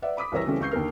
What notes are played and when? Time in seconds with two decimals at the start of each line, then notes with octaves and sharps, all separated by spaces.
0.02 B4 D5 E5 F#5
0.17 B5 D6 D#6 B6
0.32 C2 E3 A#4 C#5 E6 A#6
0.45 C#3 E3 G3 A3 C4 C#4
0.60 C#2 C#6 G6 C7
0.71 D#2 D3 A#4 F6